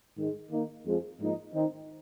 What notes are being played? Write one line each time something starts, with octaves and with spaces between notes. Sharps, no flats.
G#2 D#3 G#3
D#3 A#3 D#4
F2 F3 G#3
G#2 F3 A#3 D#4
D#3 C4 D#4